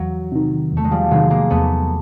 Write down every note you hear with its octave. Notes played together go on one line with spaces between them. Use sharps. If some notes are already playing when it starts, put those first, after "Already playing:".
Already playing: E2 F#3
C3 D#3
E2 A3
G#3
F3 G3
C3 D#3 F#3 G#3
G#3 A#3
E2 A3 B3